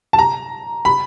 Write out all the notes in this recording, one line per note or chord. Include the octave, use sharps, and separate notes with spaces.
A5
A#5
B5